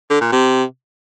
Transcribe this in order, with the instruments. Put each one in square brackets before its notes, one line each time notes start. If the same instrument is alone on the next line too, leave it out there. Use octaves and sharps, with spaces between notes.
[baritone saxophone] D3
A#2
C3